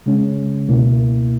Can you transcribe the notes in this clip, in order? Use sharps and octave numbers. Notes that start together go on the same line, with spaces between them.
C#3 G#3 C#4
C#2 B2 A#3 E4